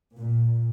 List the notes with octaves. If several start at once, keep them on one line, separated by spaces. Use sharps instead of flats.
A#2